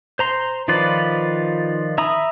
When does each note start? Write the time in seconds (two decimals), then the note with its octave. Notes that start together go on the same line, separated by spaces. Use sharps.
0.19 C5 A#5 C6
0.68 D#3 F3 F4 B4 D5
1.98 E5 A#5 B5 D#6